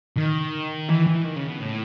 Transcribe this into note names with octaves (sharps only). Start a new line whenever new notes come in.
D#3
E3
E3
D#3
C#3
B2
A2